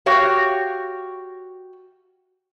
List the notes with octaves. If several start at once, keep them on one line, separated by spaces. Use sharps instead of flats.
F#4 G4 C#5 F5